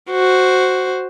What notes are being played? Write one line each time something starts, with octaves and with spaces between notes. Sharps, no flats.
F#4 C5